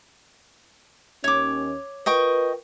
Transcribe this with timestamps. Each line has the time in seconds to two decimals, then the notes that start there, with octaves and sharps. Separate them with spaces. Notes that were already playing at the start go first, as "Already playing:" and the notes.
1.24 D#2 C#4 C#5 D6
2.06 F4 A#4 B4 D#5 G5 C#6